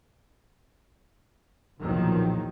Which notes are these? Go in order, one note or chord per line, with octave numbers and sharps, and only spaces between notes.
B1 E2 A#2 D#3 F3 F#3